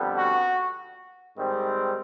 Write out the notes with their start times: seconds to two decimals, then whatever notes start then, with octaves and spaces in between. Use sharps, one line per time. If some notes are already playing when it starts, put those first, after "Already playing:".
Already playing: F2 D3 G3 B3
0.15 F#4
1.36 G#2 D#3 G3 C4